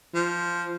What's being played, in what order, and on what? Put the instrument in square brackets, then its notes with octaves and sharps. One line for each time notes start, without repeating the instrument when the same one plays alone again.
[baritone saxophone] F3